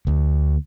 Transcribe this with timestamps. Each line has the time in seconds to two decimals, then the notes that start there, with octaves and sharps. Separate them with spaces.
0.07 D2